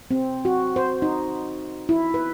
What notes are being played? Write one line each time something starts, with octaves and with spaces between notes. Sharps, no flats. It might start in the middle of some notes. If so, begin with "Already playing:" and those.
C4
F#4
C5
D#4
E4
B4